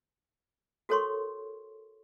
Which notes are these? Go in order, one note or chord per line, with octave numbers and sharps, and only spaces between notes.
F#4 A4 A#4 C#5 C6 C#6